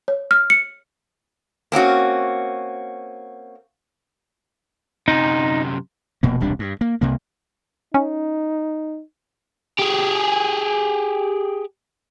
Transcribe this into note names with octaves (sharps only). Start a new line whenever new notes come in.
C#5
F6
C#7
A#3 C4 C#4 F#4
F#2 C3 D#4
F1 B2 A#3
E1 C2 G3 D4
G2
A#3
C2 C3 A#3
C#4 D#4
G4 G#4